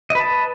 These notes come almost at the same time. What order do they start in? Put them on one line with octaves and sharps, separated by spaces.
D#5 B4 A5